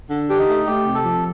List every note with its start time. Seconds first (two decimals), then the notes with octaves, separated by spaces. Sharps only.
0.10 D3
0.28 D4 G4
0.38 D#4
0.48 A3
0.66 A3 G4
0.86 C3
0.95 A4
1.04 F3